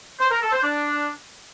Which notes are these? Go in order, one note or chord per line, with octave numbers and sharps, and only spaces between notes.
C5
A#4
A4
C5
D4